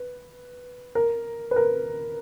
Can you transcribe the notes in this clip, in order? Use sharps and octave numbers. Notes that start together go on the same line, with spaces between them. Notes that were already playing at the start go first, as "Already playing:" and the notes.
Already playing: B4
A#4
B4
A#4